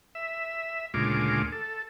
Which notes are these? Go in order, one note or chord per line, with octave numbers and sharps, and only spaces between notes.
E5
D2 A#2 C#3 G#3 F4 D6
A4